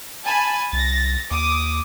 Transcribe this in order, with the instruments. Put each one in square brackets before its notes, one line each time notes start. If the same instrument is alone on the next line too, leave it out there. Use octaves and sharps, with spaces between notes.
[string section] G#5 A5 B5
[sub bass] C2 [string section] A6 A#6
[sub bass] D#2 [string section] D6 D#6